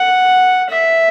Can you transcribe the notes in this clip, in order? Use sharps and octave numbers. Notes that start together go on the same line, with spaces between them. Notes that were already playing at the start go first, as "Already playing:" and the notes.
Already playing: F#5
E5